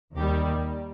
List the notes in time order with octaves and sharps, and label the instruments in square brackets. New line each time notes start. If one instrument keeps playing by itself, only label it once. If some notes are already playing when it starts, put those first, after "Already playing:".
[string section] D#2 D#3 G3 G4